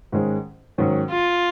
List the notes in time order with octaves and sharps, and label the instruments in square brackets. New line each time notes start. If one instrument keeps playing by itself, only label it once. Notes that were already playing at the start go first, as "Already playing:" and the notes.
[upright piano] G#2 D#3 G#3 C#4
G#2 D#3 F#3 C#4
[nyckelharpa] F4